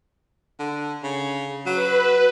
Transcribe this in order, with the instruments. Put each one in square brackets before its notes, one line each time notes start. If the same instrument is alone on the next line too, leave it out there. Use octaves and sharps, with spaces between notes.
[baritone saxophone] D3
C#3
[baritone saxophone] F#3 [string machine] B4